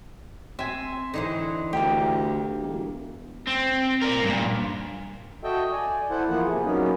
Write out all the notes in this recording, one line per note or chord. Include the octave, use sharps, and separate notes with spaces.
C4 E5 G#5
D3 E3 C4 D#4
D2 A#3 G4
E1
C4
A#4 D5
G2 A#2
F#4 A4 D#5 E5 G5
D5 G#5
E4 A4 C5 F#5
E3 F3 A#3 B3 F#5
C3 G#4
F#3 A#3 B3 C#4 D#4